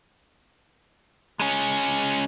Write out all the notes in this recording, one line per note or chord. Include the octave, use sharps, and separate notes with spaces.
G#3 C#4